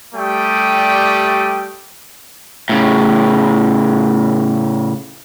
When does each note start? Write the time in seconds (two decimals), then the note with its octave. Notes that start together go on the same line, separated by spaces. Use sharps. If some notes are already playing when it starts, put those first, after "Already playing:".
0.15 G3 A3 G4 D5 G5 D#6
2.69 A2 C#3